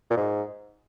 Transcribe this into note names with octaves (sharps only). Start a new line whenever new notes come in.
A#2
G#2